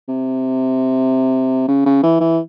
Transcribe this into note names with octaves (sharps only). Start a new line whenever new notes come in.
C3
C#3
C#3
E3
E3